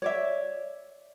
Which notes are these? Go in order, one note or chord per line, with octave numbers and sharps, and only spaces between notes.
C#5 D5 E5